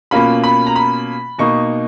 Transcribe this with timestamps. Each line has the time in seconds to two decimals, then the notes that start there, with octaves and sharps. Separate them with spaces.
0.11 B2 A#3 C#4 F4 B5
0.44 B5
0.67 A#5
0.76 B5
1.38 B2 A#3 D#4 C#6